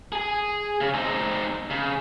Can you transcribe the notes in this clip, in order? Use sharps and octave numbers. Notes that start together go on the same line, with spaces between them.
G#4 G#5
C#3
C4 D#4
C#3